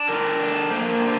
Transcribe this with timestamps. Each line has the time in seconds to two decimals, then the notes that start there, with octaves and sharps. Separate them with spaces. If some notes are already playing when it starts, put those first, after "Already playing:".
Already playing: D4
0.09 D3 A#4
0.40 D4
0.71 A#3 C5
1.01 D3